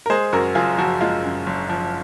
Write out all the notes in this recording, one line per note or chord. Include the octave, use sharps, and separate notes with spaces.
A#4
G#3 G#4 C5
F#2 F#4 A#4
F#1 F4 G#4
F3 F#4
G#3 F4
F#2
F#1
F3